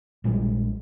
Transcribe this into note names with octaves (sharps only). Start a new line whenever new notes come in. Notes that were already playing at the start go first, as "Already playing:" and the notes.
A#1 A#2 G3 G#3